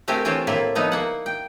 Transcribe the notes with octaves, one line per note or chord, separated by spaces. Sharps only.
A3 C4 G4 A#4 G#5
E3 C4 F4 C#5 A5
A2 A#3 E4 F4
F3 B3 D#4 E4
A#3 F#5
G5